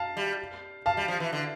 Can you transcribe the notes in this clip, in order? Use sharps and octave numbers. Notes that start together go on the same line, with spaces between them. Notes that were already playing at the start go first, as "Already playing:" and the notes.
Already playing: F5 A5
G3
F5 A5
G3
F3
E3
D3